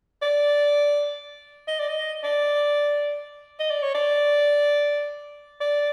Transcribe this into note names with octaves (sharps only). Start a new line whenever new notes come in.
D5
D#5
D5
D#5
D5
D#5
D5
C#5
D5
D5